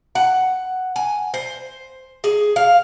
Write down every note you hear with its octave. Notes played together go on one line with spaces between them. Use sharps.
F#5
G#5
C5
G#4
F5